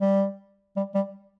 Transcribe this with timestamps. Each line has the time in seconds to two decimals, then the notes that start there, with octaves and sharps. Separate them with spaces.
0.01 G3
0.77 G3
0.95 G3